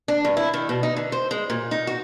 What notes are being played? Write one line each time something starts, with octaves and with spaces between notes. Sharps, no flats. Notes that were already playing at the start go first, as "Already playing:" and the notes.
D4
G2
E4
D#3
B2
D#4
D3
C5
G#3
A#2
D#4
F#4